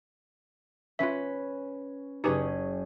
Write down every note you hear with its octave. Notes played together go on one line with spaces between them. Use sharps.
C#4 F4 B4 E5 B6
F#1 C#4 D#4 G4 G#4 B4